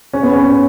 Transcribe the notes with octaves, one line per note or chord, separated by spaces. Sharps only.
C#4
B3
C#4